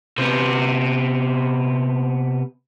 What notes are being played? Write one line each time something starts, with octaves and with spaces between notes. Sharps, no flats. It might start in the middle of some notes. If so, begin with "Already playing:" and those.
C3 B3